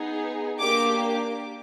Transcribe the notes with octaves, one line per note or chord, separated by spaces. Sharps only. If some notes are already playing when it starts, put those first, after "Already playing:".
Already playing: B3 D#4 G#4
A#3 D4 G4 D6